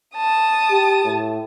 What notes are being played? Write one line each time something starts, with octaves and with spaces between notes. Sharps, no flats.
A5 D#6
G4
A2